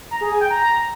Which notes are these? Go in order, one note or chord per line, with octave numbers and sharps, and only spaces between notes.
A#5
G#4
G#5
G5
A#5